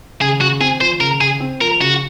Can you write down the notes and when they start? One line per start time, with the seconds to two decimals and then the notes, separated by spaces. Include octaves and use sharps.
0.21 C#3 G#4
0.41 C#3 F#4
0.61 C4 G#4
0.81 F3 C5
1.00 C#3 A#4
1.21 C#3 G#4
1.40 C4
1.60 F3 A#4
1.81 C#3 F#4